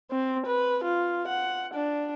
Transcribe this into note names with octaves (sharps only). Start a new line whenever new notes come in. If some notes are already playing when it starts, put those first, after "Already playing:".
C4
B4
F4
F#5
D4